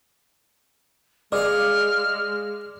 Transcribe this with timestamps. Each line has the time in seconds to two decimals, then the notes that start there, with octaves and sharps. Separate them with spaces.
1.32 G#3 G#4 D5 D#5 F5 D6 F6